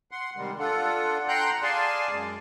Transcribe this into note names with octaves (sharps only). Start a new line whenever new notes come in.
F#5 C6
C3 D#3 G3 G#3
D4 F4 A4 F#5
F#5 G5 A#5 C6 F#6 G6
G#4 D5 F5 G#5 A5 C6
F#2 G#3